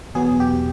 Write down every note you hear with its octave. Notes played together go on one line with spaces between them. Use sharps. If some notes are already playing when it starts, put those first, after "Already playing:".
E2 B2 F#3 B3 G#4
G4